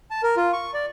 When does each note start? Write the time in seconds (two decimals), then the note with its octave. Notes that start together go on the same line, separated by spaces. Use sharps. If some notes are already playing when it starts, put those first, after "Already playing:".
0.11 A5
0.23 A#4
0.37 F4
0.53 C#6
0.74 D5